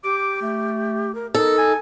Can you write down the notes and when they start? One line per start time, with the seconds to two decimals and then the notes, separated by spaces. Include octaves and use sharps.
0.04 G4 D6
0.42 A3
1.15 A#4
1.35 D#4 A4 A#4
1.58 G#5